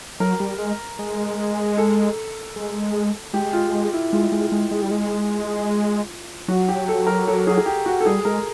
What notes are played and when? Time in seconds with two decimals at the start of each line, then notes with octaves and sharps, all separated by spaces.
0.20 F#3 A#4
0.40 G3
0.58 G#3
0.99 G#3
1.77 A4
2.56 G#3
3.34 G#3 G4
3.53 F4
3.93 E4
4.13 G#3 F4
4.32 G#3
4.52 G#3
4.71 G#3
4.82 G3
4.91 G#3
6.48 F#3 F#4
6.69 G4
6.88 A4
7.07 A#4
7.27 A4
7.47 G#4
7.58 G#4
7.66 G4
7.86 F#4
8.00 A4
8.06 G3 G#4
8.25 G#3 A#4